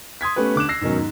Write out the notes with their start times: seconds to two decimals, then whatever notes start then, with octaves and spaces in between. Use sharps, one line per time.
0.21 C6 D#6 G#6 B6
0.36 A3 B3 C#4 G4 B4
0.56 D3 D6 F#6 E7
0.69 E6 A#6 C7
0.81 G#2 B2 D#3 F#3 C#4
0.97 G#2